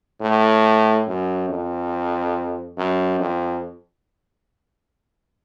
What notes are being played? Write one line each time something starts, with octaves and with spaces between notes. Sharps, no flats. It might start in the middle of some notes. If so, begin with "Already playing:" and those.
A2
F#2
F2
F#2
F2